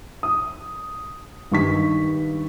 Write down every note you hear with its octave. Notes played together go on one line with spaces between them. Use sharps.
D#6
G2 D#3 C#6 B6